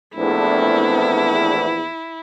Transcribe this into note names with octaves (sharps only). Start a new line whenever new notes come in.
A#1 E2 A3 C4 D4 E4